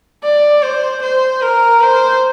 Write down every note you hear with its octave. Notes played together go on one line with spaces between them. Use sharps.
D5
C5
C5
A#4
C5